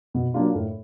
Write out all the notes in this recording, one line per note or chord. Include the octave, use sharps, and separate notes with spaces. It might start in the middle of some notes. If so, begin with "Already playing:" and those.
B2
F#3 A#3 D4 F4
A2